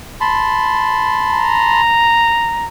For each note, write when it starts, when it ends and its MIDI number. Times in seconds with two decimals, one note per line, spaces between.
0.21 1.81 81
0.21 1.81 83
0.21 1.81 84
1.30 2.68 82